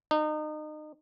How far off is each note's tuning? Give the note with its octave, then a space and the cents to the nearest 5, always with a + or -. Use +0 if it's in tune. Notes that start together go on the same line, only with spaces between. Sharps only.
D#4 -30